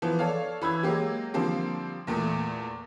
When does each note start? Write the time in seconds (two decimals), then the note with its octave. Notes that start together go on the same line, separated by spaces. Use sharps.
0.02 E3 F3 B3
0.19 A4 C#5 D5 F5
0.62 E3 B5 E6 G#6
0.83 F#3 G#3 A#3 G4
1.34 D3 F3 G3 A#3 C4
2.07 E2 A#2 A3